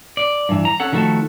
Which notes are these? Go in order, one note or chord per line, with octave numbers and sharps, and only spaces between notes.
D5
G2 E3
A#5
C#4 A4 F#5
D#3 F3 A3 F#4 A4